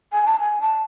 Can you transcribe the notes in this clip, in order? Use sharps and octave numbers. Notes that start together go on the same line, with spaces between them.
G#5
A5
G#5
A5